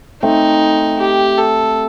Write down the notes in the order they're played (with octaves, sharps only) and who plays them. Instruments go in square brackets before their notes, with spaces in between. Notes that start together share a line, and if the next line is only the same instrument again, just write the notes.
[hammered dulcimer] A3 C4 [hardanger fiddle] D#4
[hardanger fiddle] G4
A4